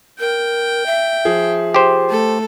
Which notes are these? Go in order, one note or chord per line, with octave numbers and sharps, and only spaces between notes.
A#4 G5
E5
F3 G#4
G4 C5
A3 A4